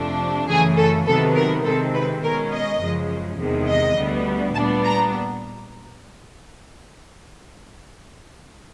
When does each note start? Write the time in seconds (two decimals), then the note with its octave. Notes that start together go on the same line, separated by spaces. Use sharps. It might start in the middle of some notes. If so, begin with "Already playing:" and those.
Already playing: F2 C3 F3 A3 D4
0.48 F#2 C#3 E3 A3 G#4
0.77 A4
1.06 C3 D#3 F#3 B3 A4
1.35 A#4
1.64 C3 D#3 G#3 C4 A4
1.94 B4
2.22 B2 G#3 C#4 A#4
2.51 D#5
2.81 F#2 C#3 F3 G#3
3.38 E2 C3 D#3 G#3
3.68 D#5
3.97 D2 D3 G3 B3
4.55 A#2 G3 B3 D4 A5
4.84 A#5